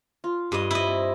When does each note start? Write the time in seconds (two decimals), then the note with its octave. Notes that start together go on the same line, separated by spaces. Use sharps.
0.24 F4
0.52 G2 B4 D#5 D6
0.71 E4 C5 D#5 A5 C6
0.87 C4